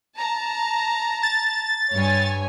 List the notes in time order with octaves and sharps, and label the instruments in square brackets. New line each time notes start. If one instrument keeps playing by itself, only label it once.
[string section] A5 A#5
[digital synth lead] A6
[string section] G2 C#5 G#5